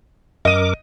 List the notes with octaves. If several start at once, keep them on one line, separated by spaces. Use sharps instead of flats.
F#2 A#4 D#5 D6 D#7